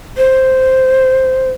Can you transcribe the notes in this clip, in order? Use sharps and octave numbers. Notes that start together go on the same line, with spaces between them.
C5